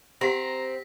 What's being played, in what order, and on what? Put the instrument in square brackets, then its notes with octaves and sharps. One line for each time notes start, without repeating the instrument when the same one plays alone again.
[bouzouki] C4 [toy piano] G4 F#5 [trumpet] A#5 [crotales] A#6 B6